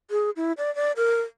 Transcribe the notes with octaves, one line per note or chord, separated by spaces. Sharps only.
G#4
E4
D5
D5
A#4